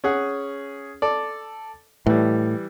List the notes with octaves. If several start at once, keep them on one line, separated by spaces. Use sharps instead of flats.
C#4 G#4 F#5
A4 D5
A2 E3 G3